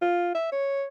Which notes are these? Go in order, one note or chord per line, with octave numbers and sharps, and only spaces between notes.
F4
E5
C#5